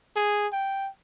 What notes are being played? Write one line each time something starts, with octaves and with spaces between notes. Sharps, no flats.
G#4
G5